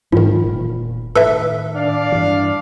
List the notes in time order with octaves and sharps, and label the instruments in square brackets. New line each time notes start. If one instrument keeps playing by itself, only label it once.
[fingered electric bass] F2 E3 F#3 [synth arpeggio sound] G#2 D#3 [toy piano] F4
[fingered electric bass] E1 A#2
[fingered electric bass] A2 D#3 [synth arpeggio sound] A4 B4 E5
[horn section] D4 D5 F5
[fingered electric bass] G2 E3